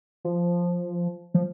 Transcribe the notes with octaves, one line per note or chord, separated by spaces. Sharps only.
F3
F3